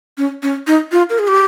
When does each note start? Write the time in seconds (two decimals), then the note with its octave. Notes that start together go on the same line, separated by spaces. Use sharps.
0.18 C#4
0.43 C#4
0.67 D#4
0.92 F4
1.10 A#4
1.19 G#4
1.28 G4